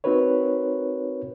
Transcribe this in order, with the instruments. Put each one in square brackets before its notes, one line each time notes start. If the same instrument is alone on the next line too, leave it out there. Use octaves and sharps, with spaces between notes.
[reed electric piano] C4 D#4 F#4 A#4 B4 C#5